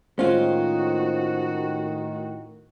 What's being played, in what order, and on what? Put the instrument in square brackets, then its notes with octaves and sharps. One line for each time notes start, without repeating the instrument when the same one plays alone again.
[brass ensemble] A2 D#3 [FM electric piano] G#3 C5 [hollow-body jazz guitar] C#4 F4 [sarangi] F#4